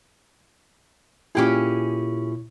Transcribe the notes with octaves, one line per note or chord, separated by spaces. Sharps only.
A#2 C#4 E4 G4 G#4